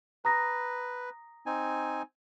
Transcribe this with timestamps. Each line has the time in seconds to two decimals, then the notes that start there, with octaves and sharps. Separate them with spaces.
0.25 B4 A#5 D#6 A#6
1.46 C4 D#4 G#5